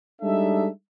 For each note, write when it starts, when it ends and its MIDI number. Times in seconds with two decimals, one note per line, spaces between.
0.21 0.67 55
0.21 0.67 56
0.21 0.67 62
0.21 0.67 63
0.21 0.67 69
0.21 0.67 76